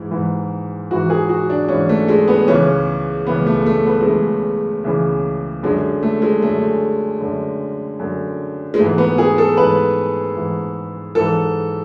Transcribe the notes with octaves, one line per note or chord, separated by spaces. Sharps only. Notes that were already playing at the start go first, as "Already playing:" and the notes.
Already playing: G#2 E3
G#2 E3
G#2 E3 F#4
G#4
F#4
D4
G#2 E3 C#4
A3
G#3
B3
C#2 C#3 E3 C#4
C#2 C#3 E3 B3
A3
A3
B3
G#3
C#2 C#3 E3 A3
C#2 C#3 E3
F#2 D3 G#3
A3
G#3
F#2 D3 A3
F#2 D3
F#2 D3
G#3
G#2 E3 A3
B3
G#4
A4
G#2 E3 B4
G#2 E3
G#2 E3 A4